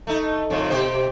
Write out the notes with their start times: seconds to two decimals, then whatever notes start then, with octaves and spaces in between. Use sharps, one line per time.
0.07 A3 D#4
0.50 F2 G#2 C#3
0.70 B2 G4 C5